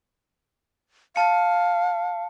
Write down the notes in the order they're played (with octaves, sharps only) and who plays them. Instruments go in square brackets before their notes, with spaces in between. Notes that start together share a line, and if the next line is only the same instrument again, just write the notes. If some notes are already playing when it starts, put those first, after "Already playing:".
[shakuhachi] F5 [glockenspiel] A5 C#7